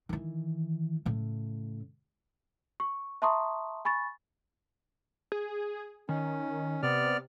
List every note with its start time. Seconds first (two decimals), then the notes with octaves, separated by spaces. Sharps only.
0.09 D#3 E3
1.06 A2 C#3
2.80 C#6
3.22 E5 A5 A#5 C6 C#6 D#6
3.85 G#5 B5 C#6 A6
5.32 G#4
6.09 D#3 C#4
6.83 C3 B3 D5 F6